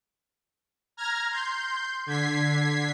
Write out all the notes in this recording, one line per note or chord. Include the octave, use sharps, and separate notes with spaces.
A#5 F6 G#6 A#6
C6 G6
D3 G#6 B6 C7